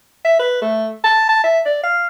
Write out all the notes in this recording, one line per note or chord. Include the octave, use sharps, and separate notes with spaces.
E5
B4
A3
A5
A5
E5
D5
F5